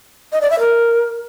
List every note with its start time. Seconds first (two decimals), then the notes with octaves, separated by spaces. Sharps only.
0.32 D#5
0.41 D5
0.50 E5
0.59 A#4